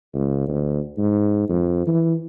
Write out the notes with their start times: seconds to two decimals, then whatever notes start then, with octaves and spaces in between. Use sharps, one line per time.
0.14 C#2
0.48 D2
0.98 G#2
1.49 F2
1.87 E3